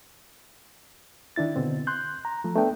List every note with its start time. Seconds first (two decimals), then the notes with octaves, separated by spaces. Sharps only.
1.36 D#3 D4 E4 A6
1.56 B2 D3 C4
1.87 C6 F#6 G6
2.25 A#5
2.44 F3 A3
2.56 A3 B3 D4 G5